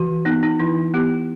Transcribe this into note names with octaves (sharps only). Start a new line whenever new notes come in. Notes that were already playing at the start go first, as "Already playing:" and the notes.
Already playing: E3 F#4
B3 D#4
D#4
E3 E4
B3 G4